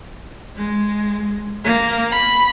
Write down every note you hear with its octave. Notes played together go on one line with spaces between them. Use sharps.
G#3
A#3
B5